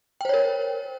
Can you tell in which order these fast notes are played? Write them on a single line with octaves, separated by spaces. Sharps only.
G5 C5 C#5 A#4